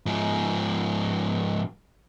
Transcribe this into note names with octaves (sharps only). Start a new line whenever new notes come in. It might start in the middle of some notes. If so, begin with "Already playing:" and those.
G#2 F3